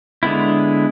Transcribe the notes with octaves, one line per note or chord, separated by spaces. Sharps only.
D3 G#3 B3 E4